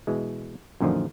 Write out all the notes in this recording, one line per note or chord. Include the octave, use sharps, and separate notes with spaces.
B2 E3 G#3
F#2 A#2 D3 D#3 F3